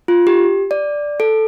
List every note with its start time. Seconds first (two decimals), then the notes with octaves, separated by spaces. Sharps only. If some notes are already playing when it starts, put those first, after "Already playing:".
0.08 F4
0.27 G4
0.71 D5
1.20 A4